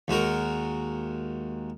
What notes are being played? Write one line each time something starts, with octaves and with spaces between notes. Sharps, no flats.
D#2 G#3 F#4 A#4